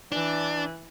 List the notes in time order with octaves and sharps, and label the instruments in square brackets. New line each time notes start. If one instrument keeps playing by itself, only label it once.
[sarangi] E3 [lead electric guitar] D4